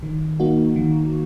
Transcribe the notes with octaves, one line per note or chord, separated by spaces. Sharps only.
D#3
A#3 D#4 F#4
D#3